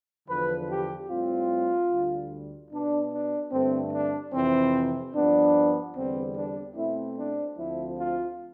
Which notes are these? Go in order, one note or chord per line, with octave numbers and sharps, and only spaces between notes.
E2 D3 F3 B4
G4
A2 G3 C4 F4
D2 D3 G3
B2 B3 D4
D4
G2 D3 A3 C4
D4
F2 C3 E3 C4
G2 F3 B3 D4
E2 D3 G3 B3 C4
D4
B2 A3 C4 E4
D4
D2 D3 F3 C4 E4
F4